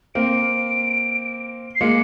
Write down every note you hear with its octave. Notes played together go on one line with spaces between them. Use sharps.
A#3 C4 D7
C7
G#3 A#3 C#7